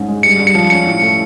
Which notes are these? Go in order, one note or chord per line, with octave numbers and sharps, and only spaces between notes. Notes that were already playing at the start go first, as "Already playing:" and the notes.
Already playing: G#2 C#4
G#3
G2 C#7
G2
C#7
F3
C#4 C#7
A2
A3